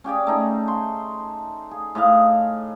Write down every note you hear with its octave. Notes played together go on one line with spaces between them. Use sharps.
C#4 G4 G#4 D5
A3 D#4 G#4
C6
G#4
A2 G#4 D#5 F5